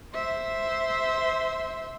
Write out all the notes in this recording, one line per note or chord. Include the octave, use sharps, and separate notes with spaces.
C5 E5